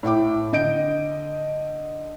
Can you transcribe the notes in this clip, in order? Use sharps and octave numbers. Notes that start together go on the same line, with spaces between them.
A2 E4 G5 D6
D3 D#5 G6 D7